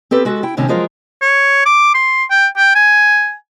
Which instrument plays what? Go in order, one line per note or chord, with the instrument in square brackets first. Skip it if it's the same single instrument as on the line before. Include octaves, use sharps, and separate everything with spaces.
[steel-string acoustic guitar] C4 G4 A4 B4
G#3 F#4 A4
E4 G5
A2 C3 D#3 C#4 A5
F3 F#3 G#3 F4 A#4
[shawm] C#5
D6
C6
G5
G5
G#5